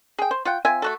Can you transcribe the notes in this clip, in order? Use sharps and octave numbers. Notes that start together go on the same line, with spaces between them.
G#4 G5
C5
F4 F#5 G5
C4 F4 E5 G#5
A3 F#4 A4